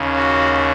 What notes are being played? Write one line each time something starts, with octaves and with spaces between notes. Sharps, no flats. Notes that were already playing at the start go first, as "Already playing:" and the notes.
Already playing: D#2 C#3
F#4